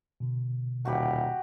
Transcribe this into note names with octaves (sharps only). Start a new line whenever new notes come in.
B2 D3
D#1 F#4 G4 B5